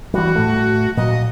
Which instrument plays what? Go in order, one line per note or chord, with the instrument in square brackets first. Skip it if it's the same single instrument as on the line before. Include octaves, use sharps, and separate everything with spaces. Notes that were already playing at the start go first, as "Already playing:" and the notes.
[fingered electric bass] E3 G3 [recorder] F#4
[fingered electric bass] A2 A3
[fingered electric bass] A#2 F#3 [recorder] D#5